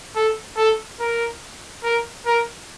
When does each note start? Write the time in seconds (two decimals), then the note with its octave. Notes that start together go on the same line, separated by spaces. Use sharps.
0.15 A4
0.57 A4
1.00 A#4
1.84 A#4
2.26 A#4